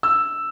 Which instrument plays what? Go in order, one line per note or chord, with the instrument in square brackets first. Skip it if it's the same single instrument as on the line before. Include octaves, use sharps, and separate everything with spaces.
[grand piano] E6